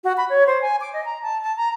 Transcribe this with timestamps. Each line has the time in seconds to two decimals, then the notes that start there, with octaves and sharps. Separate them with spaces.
0.04 F#4
0.17 B5
0.29 C#5
0.47 C5
0.62 G#5
0.81 D6
0.93 D#5
1.05 A#5
1.22 A5
1.42 A5
1.57 A#5